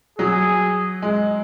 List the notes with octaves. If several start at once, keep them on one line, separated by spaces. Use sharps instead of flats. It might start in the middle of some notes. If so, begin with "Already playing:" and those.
F#3 G#4
G#3